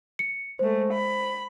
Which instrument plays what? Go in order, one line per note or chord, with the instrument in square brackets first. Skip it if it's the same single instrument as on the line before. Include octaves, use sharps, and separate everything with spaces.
[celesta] C#7
[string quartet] G#3 A3 [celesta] C5
[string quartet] B5